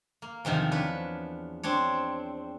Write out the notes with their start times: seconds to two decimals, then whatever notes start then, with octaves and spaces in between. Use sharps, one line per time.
0.22 A#3
0.45 E2 C3 D#3 F3
0.71 D4 B4 C#5
1.63 C4 D4 C#5